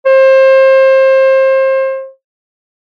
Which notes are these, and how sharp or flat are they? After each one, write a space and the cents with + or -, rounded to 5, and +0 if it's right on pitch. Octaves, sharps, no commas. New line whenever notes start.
C5 +30